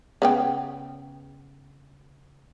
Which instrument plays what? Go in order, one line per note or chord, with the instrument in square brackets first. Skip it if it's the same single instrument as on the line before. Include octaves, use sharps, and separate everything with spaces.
[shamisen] C#3 B3 G5